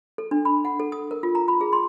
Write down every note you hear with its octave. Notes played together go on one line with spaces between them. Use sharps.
A4
D4
B5
F#5
A4
D#6
A#4
F4
A#5
B5
G#4
C6